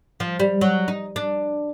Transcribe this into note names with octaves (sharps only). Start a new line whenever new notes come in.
F3
G3
F#3
D#4
D4